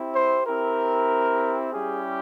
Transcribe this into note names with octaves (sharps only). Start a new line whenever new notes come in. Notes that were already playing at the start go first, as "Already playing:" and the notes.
Already playing: C4 E4 G4
C5
C4 E4 G4 A#4
G3 C#4 E4 G4 G#4